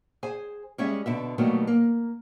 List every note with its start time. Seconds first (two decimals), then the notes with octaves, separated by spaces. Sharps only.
0.23 G#4 C5 G#5
0.78 G3 G#3 C#4 G#4 E5
1.06 B2 D3 E5
1.38 B2 D#3 F#3 G3 A3 A#3
1.67 A#3